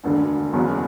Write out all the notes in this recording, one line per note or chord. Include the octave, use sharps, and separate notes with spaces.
E1 D2 D3
F#1 E2 B2 F#3